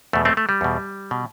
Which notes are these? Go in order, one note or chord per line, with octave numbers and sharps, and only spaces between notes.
E2 B2 A3
A3 C4
A3
G3
E2 B2
B2